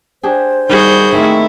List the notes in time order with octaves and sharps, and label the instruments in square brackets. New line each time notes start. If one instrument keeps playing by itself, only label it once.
[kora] D4 G4 G#4 [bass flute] C5
[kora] D#3 [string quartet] G3 G6 [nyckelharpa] F#4 G#4
[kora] D#3 A#3 C4 [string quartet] A3 E4